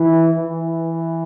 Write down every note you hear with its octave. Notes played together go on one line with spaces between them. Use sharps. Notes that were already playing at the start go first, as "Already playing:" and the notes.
Already playing: E3
E3